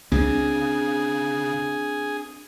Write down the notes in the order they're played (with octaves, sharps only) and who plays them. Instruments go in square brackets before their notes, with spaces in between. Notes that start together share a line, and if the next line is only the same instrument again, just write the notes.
[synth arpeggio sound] C#2 [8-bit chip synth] C#3 [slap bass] C4 D4 [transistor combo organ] G#4